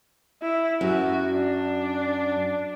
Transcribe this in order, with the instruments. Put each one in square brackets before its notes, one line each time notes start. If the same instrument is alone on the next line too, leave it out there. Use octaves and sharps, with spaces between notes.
[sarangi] E4
[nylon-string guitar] F#2 [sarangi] F#4
[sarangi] D4